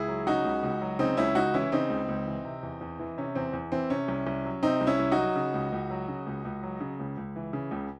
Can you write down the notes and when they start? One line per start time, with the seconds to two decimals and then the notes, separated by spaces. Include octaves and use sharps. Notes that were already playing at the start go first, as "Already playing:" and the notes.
Already playing: C#2 E4 G#4
0.08 F#3
0.27 C#3 D#4 F#4
0.45 C#2
0.63 C#2
0.82 F#3
0.99 C#3 C4 D#4
1.17 C#2 C#4 E4
1.35 C#2 D#4 F#4
1.54 E3 C#4 E4
1.72 C#3 C4 D#4
1.90 C#2
2.09 C#2
2.27 E3
2.45 C3
2.63 E2
2.81 E2
2.99 E3
3.18 C3 C#4
3.35 E2 C4
3.53 E2
3.72 E3 C4
3.90 C3 C#4
4.08 C2
4.27 C2
4.45 F#3
4.63 C3 C4 D#4
4.81 C2
4.87 C#4 E4
4.99 C2
5.12 D#4 F#4
5.17 F#3
5.36 C#3
5.54 C#2
5.73 C#2
5.90 F#3
6.08 C#3
6.27 C#2
6.45 C#2
6.63 F#3
6.80 C#3
7.00 C#2
7.17 C#2
7.36 E3
7.53 C#3
7.71 C#2